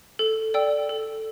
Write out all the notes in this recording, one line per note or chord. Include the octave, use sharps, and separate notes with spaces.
A4
D5 G5 E6
A4